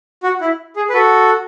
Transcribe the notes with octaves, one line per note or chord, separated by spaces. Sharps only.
F#4
E4
G#4
B4
F#4 A4